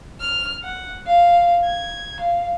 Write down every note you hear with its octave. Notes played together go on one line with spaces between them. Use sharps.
F6
F#5
F5
G#6
F5